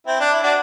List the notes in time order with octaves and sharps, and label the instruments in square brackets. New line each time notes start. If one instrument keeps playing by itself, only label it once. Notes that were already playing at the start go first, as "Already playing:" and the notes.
[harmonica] C4 E4
D4
E4
D4 F#4